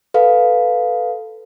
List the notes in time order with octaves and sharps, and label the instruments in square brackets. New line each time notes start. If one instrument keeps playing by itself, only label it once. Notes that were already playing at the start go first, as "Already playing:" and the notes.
[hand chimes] A4 B4 F5